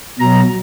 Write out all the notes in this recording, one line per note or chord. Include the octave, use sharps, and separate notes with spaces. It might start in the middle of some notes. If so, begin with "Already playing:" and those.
B2 F#3 A#5